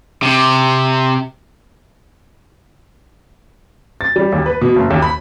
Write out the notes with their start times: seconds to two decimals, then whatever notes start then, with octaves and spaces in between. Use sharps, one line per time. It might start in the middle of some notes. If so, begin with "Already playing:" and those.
0.22 C3
4.01 A6
4.16 G3
4.32 D#2
4.46 B4
4.61 B2
4.76 F#1
4.90 D#2
5.02 B5